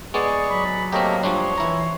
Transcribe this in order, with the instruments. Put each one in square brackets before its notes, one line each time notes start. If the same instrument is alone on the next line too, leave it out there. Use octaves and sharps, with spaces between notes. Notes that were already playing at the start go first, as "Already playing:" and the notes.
[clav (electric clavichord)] G#3 B3 [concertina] G#4 D5 C#6
[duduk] F#3 [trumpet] B5
[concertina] A3 C#5 D#5 [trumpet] A#3 [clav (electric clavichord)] C4 G4
[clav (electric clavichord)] F3 G3 D4 [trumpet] C#5 [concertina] C6
[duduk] E3 [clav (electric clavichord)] E4 A#5